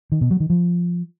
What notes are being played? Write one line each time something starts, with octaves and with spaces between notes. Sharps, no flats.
D#3
B2
F#3
D#3
F3